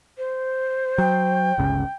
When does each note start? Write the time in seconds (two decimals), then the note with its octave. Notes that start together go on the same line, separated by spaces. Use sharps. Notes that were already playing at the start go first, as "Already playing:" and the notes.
0.17 C5
0.98 F#3 G5
1.58 G1 C#2 C#3